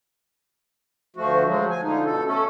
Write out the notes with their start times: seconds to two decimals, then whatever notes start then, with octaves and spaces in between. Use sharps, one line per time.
1.16 D2 F3 A3 F#4
1.46 F3 F#3 G#3
1.70 G#5
1.83 D3 F3 D#4
2.05 B2 A4
2.25 A3 C#4 A4